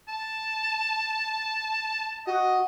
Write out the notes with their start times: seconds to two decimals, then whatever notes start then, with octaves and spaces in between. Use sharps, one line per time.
0.09 A5
2.27 F#4 D#5